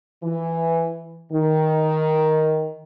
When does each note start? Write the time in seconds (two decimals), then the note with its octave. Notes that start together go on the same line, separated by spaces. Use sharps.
0.23 E3
1.32 D#3